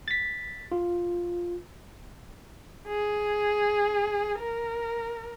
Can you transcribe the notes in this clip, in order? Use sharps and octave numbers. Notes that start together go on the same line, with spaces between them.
A6 B6
F4
G#4
A#4